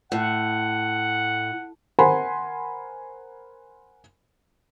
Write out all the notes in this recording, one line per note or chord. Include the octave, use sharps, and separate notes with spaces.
A2 F#5
A#4 C5 F#5 G#5 B5 C6